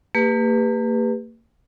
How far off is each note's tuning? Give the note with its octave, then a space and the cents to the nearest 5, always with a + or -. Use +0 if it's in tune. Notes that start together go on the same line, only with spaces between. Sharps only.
A#3 -40 G4 +35 B4 +0